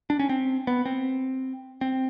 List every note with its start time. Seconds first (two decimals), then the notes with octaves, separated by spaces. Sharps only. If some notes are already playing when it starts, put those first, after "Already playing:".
0.10 D4
0.19 C#4
0.29 C4
0.67 B3
0.85 C4
1.81 C4